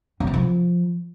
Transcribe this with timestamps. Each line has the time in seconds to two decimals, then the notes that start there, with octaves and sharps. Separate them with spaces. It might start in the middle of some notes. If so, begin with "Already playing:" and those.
0.20 C#3
0.27 C3
0.34 F3